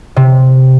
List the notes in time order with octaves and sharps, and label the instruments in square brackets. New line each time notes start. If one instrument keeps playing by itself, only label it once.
[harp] C3